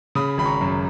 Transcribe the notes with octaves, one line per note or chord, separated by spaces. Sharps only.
C#3 B5 D#6
G#1 B5
A#5 C#6
F#2